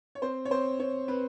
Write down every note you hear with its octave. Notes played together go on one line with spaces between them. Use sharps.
C#5
C4 C5
C#5
C4 C5
C4 C#5
C4 B4